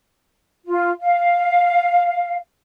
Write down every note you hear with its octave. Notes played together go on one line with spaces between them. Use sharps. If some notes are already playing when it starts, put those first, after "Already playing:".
F4
F5